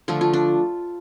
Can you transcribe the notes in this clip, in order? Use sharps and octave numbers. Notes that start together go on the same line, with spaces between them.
D3 F3 A3 F4
F4
D4